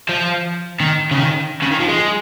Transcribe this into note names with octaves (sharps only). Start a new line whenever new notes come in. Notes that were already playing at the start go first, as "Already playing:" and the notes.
F3
D#3
C#3
D#3
C#3
D#3
F3
G#3